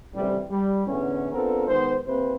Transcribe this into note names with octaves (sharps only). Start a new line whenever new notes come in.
A1 D2 C3 E3 G3
G3
E2 A2 D3 C#4
B3 C4 D4 F4 A4 A#4
D#3 G#3 B3 C5
C3 E3 A#3 C4 B4 C5